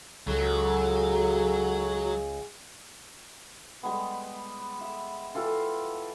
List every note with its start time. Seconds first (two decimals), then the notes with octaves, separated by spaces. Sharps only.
0.27 C#2 F#3 G#4 A4
3.83 G3 G#3 B3
4.81 E5
5.35 E3 F4 G4 A4